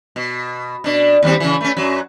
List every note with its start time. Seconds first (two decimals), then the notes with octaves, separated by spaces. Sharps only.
0.16 B2
0.84 B2 D4
1.23 D#2 G3 C4
1.40 C#3 E3
1.61 A3 C#4
1.77 F#2 F#3